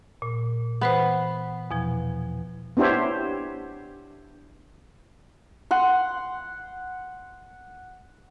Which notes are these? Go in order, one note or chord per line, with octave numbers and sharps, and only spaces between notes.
A#2
E3 B3 B4 C5
E2 B2 F3
B3 D4 E4 G4 C5 C#5
F#5 C6